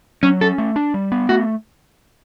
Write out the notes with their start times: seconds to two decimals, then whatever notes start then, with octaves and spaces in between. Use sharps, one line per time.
0.23 F#3 C#4
0.41 C#4 A4
0.58 A3
0.76 D4
0.94 G3
1.12 B3
1.29 A3 F#4